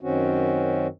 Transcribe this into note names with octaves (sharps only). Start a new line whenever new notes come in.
F#2 D#3 C4 C#4 F#4